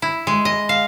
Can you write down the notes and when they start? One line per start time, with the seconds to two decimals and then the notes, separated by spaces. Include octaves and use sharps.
0.02 E4
0.27 G#3
0.45 D#5
0.69 F5